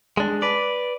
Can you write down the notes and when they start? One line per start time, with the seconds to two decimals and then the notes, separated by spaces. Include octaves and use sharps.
0.17 G#3 D4
0.42 B4 D5